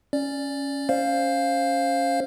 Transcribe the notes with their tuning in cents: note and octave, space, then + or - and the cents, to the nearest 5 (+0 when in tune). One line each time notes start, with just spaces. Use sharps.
C#4 +0 D5 +0
C#4 +0 C5 +10 F5 +0